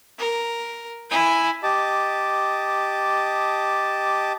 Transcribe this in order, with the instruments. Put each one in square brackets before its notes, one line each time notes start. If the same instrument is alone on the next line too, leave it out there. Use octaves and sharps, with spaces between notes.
[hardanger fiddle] A#4
E4 G#5
[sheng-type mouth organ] G4 D#5 A5 D6